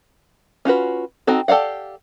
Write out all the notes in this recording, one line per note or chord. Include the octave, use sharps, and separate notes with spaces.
C#4 F4 F#4 B4
C4 D#4 F#4 A4
G4 A4 D5 F5 F#5